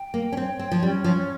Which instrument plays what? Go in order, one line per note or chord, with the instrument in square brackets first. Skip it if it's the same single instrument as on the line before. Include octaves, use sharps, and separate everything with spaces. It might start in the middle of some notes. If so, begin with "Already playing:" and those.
Already playing: [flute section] G5
[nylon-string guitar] A#3
C#4
[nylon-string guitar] C4 [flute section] C#5
[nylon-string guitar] C4
F3
[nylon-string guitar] G3 [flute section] C#4
[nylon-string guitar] F3